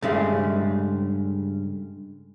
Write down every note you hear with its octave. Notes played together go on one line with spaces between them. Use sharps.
G2 C#3 G#3 A3